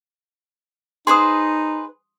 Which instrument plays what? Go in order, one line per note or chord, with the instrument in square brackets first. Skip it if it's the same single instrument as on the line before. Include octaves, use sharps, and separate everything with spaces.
[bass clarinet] D#4 [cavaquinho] G#4 B4 C5 [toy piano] C6 D#6